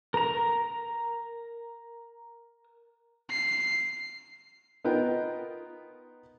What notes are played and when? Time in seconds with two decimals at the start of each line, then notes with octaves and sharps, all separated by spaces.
0.14 A#4 A#5
3.30 C7
4.84 B3 D#4 F4 A#4 B4 G5